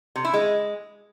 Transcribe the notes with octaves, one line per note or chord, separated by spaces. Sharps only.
C3
E4
G#3